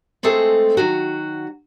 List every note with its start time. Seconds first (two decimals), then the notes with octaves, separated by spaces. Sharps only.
0.23 G#3 A3 C4 G#4 A4
0.77 D#3 F#3 F#4